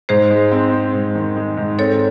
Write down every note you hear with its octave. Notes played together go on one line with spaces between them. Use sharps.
G#2 G#4 C5
G#3
C4
C4
G#2
D#3
G#3
G#2
C4 A4 C#5